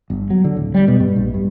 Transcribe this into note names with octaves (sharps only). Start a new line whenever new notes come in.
G1
F#3
D3
D1
G3
B2
G2
A#1
G2